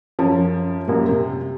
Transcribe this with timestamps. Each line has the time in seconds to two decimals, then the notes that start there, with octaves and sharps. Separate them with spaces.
0.19 F#2 F3 C#4
0.87 F#2 A#2 G3
1.08 C3